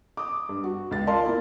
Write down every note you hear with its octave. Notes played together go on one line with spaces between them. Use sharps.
D6 D#6
G2
F#4
C#2 A6
F4 A#4 D5 F5 A5 C6
A#3 E4 A#4